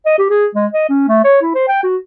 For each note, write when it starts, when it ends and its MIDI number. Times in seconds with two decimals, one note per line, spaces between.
0.06 0.17 75
0.19 0.26 67
0.30 0.46 68
0.55 0.67 56
0.74 0.84 75
0.89 1.07 61
1.08 1.23 57
1.24 1.39 73
1.42 1.53 64
1.55 1.63 72
1.68 1.82 79
1.83 1.97 66